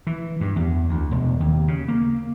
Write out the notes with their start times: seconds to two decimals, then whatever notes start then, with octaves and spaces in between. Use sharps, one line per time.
0.07 E3
0.41 G2
0.56 E2
0.89 D2
1.11 E1
1.40 D#2
1.68 C#3
1.88 A#3